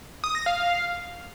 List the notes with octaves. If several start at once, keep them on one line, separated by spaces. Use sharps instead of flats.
D#6
A#6
F5